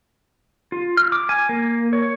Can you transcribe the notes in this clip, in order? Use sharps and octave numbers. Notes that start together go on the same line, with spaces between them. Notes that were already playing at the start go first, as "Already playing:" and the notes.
F4
F6
D6
G#5
A#3
C#5